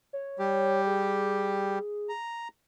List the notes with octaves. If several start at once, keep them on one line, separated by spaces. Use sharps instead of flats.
C#5
G3 G4
G#4
A#5